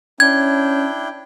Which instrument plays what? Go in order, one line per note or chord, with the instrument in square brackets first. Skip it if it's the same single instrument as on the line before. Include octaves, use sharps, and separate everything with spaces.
[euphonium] C#4 [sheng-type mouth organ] D4 E4 G5 [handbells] G#6